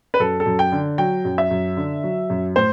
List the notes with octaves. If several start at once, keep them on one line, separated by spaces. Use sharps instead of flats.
B4
F#2 A4
A4
F#2
G5
D3
F#3 G5
F#2
E5
F#2
D3
F#3
F#2
A2 C5